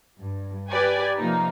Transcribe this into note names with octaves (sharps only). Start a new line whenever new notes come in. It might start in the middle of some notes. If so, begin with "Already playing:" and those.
G2
G4 B4 D5 G5 G#5
C3 F3 A#3 D#4